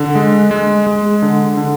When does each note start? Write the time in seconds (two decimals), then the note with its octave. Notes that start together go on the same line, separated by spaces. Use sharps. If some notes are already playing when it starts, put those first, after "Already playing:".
Already playing: D3
0.15 G#3
0.51 G#3
0.87 G#3
1.22 D3
1.57 D3